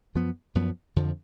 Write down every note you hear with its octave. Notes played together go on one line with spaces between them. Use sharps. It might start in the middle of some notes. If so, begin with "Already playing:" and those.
F#2 F3 B3
F#2 F3 B3
F2 D3 F3